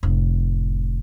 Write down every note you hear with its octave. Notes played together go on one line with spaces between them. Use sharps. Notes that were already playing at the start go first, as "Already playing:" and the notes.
F1 A2